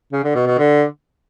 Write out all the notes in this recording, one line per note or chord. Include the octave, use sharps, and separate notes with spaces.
C#3
D3
B2
B2
D3